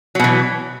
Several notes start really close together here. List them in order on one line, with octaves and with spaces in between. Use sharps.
F#3 B2 E3